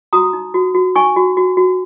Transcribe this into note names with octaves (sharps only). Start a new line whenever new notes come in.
F#4 A#5 D#6
D#4
F#4
F#4
D#4 G#5 C#6
F#4
F#4
F#4